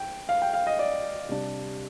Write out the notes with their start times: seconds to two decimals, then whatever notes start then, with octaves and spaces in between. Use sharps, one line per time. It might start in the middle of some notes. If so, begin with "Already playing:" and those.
Already playing: G5
0.29 F5
0.42 G5
0.53 F5
0.67 D#5
0.79 D5
1.29 C3 G3 D4